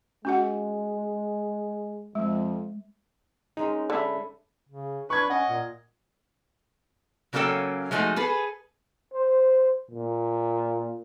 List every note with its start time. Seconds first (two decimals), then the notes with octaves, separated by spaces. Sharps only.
0.25 G#3 C#4 F#4 F#5
2.15 F2 G#3
3.57 G#3 C#4 D#4 A#4
3.90 D3 A4 E5 B5
4.69 C#3
5.10 D4 B4 C#6 G#6
5.30 C#4 D#5 F#5
5.49 A#2
7.33 C#3 F#3 A#3 C#4 A4 G5
7.91 F3 G#3 A3 D#4 F#4
8.16 G#4 A4 B4
9.13 C5
9.91 A#2